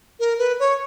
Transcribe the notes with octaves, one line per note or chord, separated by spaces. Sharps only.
A#4
B4
C#5